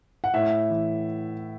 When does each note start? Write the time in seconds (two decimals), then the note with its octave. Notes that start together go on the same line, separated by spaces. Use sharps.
0.24 F#5
0.34 A2 E5
0.70 E3